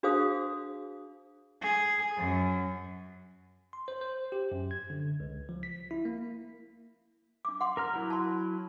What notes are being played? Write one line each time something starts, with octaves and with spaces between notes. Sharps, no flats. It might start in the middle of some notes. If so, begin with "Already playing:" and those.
D4 F#4 G#4 C5 F5 D#6
G#4
F#2
C6
C5
C5
G4
F#2
G#6
D3
C#2
F3
B6
E4
A#3
D4 D6
F#5 C6 D6
A#4 A#5 F6
F#3 E4
A5 C6